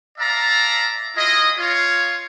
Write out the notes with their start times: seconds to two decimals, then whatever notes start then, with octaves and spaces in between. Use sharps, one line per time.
0.18 D5 E5 F5 A5 A#5
1.16 E4 F4 G#4 D#5
1.58 F4 C#5